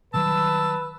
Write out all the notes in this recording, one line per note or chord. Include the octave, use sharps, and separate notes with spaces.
D#3 F#3 G3 B4 A5 E6